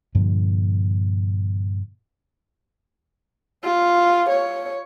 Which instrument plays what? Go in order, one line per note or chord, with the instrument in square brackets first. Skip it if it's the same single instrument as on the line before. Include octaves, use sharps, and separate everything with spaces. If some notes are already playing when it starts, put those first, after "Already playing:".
[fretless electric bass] G2 A#2 D3 F3
[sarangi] F4
C#5